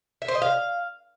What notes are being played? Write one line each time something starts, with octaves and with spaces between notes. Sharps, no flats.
E5
C5
D#5
F5